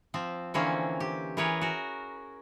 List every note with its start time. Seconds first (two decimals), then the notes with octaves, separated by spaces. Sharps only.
0.14 F3 C4
0.54 D3 E3 F3 A#3 C4 C#4
1.00 G4
1.37 E3 G#4 A#4 B4 C#5
1.61 F#4 A#4